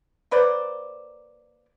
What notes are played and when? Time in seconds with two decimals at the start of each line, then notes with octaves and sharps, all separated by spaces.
0.31 A#3 B4 C5 D5